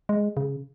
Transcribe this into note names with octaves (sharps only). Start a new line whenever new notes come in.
G#3
C#3